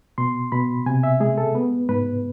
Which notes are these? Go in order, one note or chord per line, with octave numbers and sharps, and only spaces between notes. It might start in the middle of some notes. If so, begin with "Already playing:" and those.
B2 C6
B2 B5
C3 G#5
E5
G#3 G#4
A4
B3 B4
G#2 B4